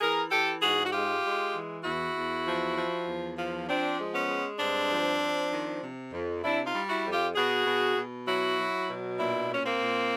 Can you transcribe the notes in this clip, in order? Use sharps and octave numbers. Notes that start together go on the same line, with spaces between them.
E3 G#4 A#4
E3 G4 A4
G#2 F#4 G#4
F#4
G#3 F4 G4
G#3
E3
E2 E4 F#4
E2
F3
F3
E2
F3
F3 C4 D4
G#3
B3 C#4
G#3
G2 C4 D4
F3
F3
D#3
C3
F2
C3 D4 E4
D#4 F4
G3
E4 F#4
F2
F4 G4
B2 F#4 G#4
B2
B2
F#3 E4 F#4
F#3
B2
A#2 D4 E4
A#2
C#4
A#3 C4
A#2